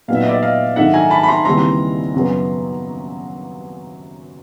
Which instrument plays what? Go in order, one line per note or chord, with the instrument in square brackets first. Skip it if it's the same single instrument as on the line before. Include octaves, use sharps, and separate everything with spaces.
[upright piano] A#2 F#3 B3 D#4 F#4 [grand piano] F5
[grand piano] E5
D#5
D5 E5
D#5 F5
[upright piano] G#2 D#3 F#3 A3 D4 [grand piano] E5 F#5
[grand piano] G#5 A#5
A5 B5
B5
A#5 C6
[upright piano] D#2 C#3 E3 G3 C4 [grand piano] A#5 C6
[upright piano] F#2 C#3 F#3 B3